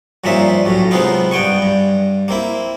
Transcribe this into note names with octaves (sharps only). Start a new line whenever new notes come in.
G2 A#2 F3 C#4 D#4 E5
B1 A2 C#4
C3 G#3 B3 C4 D#4 F4
G2 B3 G5 G#5 C#6
G2
A#3 C4 E4